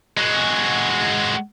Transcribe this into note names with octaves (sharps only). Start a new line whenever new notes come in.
G#3 F#4